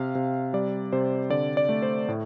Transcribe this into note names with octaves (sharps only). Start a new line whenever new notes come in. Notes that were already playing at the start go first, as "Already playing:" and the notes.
Already playing: C3 F5
C3
G3 D5
C3 C5
D3 D5
D5
A3
C5
A2